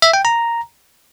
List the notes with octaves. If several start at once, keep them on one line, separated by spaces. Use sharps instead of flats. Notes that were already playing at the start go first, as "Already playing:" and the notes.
E5
G5
A#5